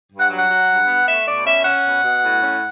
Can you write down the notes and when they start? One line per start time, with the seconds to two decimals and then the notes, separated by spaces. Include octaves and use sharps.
0.11 G2
0.20 F#5
0.30 F#3
0.37 F#5
0.49 F#3
0.68 G2
0.87 B3
1.07 A3 E5
1.26 B2 D5
1.46 C#4 E5
1.65 C#4 F#5
1.84 B2
2.04 B2
2.23 A2
2.43 C#4